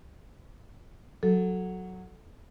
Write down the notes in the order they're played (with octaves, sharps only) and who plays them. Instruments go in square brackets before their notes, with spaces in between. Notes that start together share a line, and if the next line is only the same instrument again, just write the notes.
[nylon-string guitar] F#3 [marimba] A4